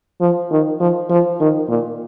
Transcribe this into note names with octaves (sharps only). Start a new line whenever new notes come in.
F3
D#3
F3
F3
D#3
A#2